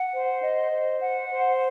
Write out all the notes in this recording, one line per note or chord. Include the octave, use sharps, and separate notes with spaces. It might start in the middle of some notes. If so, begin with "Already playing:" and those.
Already playing: F#5
C5
D#5
C5
F#5
C5